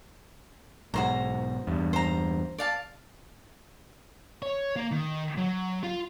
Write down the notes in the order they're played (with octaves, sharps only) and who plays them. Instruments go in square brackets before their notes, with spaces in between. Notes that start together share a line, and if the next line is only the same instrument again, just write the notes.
[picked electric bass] B1 G#2 [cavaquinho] F#4 C5 A#5
[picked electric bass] E2 G2
[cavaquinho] C5 A#5
D5 F5 A5
[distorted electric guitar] C#5
A#3
D#3
F#3
F4